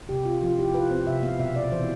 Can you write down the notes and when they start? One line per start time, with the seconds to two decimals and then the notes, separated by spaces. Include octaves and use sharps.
0.09 C3 G4
0.25 F4
0.42 F3 F4
0.59 E4 G4
0.74 F4 B4
0.91 C4 C5
1.07 C3 E5
1.23 B3 F5
1.40 B2 E5
1.56 B2 D5
1.72 E3 C5